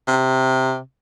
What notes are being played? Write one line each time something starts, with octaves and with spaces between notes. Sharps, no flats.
C3